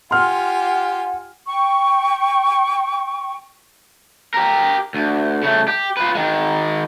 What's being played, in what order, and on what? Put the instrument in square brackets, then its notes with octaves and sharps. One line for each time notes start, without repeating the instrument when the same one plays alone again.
[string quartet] F4 G4 G#5 [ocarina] F#5 [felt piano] C6 F6
[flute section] G5 C#6
[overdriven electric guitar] G4 A#4
D2
C#3 A3
G4
F4 B4
D#3 G#3